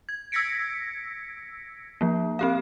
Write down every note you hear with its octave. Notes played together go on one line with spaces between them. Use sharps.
G#6
E6 G#6 A#6 B6 C#7 D7
F3 A#3
C4 G4 F5